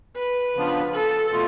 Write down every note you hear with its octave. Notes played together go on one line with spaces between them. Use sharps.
B4
C#3 F3 B3 D4 F4
A4
B2 A3 F4